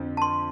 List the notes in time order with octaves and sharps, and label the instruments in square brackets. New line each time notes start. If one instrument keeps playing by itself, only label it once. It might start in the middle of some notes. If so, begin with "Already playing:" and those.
Already playing: [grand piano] F2 D3 F3 C4
[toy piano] A5
C6